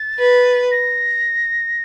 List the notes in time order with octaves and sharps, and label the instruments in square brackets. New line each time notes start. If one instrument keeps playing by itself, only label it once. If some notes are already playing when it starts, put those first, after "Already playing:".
Already playing: [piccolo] A6
[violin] B4
[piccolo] A#6